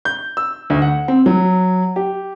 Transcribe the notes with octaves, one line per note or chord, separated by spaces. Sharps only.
G6
E6
D2
F#5
C4
F#3
G4